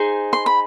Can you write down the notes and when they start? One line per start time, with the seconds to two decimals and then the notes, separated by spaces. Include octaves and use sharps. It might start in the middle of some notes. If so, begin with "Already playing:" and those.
Already playing: D#4 G#4 C5
0.33 C6
0.46 B5